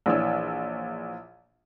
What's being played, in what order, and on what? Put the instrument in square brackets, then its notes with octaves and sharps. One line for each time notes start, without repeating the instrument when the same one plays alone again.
[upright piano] A#1 E3 C#5 D5 E6